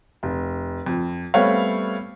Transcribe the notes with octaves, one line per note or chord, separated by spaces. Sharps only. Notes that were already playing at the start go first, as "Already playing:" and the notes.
F1
F2
G3 A3 B3 C4 C#5 F5